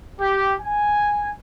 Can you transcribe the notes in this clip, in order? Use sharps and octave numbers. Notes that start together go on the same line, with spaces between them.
G4
G#5